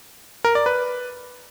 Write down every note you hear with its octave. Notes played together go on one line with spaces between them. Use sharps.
A#4
D5
B4